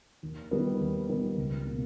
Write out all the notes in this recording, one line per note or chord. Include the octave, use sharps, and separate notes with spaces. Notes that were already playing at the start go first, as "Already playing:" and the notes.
D#2
D#3 G3 B3
D#2
D#3 G3 B3
C#2
B2 A#3